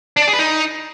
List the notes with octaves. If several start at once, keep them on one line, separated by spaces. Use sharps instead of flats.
D4
D5
G#4
B4
D#4